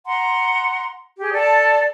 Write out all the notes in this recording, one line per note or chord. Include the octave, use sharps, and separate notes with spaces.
F#5 A#5 C6
G4 G#4
A4 D5 A5